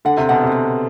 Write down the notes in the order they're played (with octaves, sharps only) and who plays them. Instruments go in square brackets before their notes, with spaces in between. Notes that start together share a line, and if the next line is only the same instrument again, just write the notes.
[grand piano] D3 [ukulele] F#5
[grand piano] C3
[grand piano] B2 [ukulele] F#5
[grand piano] C3
[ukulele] B4